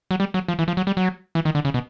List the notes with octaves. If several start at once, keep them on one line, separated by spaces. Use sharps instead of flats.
F#3
G3
F#3
F3
E3
F3
F#3
G3
F#3
E3
D#3
D3
C#3
B2